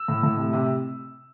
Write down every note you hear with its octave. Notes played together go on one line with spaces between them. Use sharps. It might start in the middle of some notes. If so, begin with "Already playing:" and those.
Already playing: E6
A2
A2
C3
C3